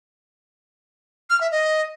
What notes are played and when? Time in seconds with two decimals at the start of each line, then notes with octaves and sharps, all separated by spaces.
1.30 F6
1.41 E5
1.51 D#5